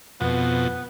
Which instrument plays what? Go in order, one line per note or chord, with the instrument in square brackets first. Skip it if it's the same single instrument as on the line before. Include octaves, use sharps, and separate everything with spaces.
[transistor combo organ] F2 B2 [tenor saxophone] B3